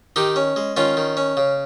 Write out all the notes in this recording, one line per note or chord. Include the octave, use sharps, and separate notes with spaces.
D#3 D#4 G4
C#4
G#3
D#3 C#4 F4
D#3
C#4
C#3